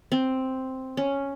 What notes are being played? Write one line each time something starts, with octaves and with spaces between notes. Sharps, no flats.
C4
C#4